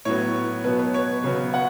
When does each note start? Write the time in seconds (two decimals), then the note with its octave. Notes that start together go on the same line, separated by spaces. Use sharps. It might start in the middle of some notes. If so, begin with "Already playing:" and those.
0.05 A2 F#3 B3 C#5
0.64 B2 F#3 B3 B4
0.79 B4
0.94 C#5
1.24 C#3 F#3 B3
1.54 F#5